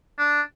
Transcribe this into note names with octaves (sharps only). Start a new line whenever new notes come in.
D4